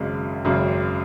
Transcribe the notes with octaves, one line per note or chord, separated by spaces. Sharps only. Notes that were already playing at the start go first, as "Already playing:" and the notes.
Already playing: G#1 F#2 C#3 G#3
G#1 F#2 C#3